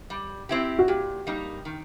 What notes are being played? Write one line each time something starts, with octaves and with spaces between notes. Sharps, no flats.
G3
C4 E4 G4
F#4
A#2 G4
G3 A#3 D#4
D#3